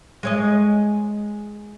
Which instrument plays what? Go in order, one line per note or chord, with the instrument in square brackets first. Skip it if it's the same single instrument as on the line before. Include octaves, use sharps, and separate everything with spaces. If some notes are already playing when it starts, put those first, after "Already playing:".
[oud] G#3 C#5 D#5